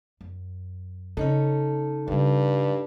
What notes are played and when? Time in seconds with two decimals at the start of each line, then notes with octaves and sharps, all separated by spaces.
0.21 F#2
1.17 C#3 C#4 D#4 A4
2.08 G2 C#3 G3